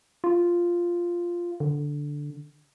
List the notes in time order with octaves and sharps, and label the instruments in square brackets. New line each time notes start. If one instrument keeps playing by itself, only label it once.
[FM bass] F4
D3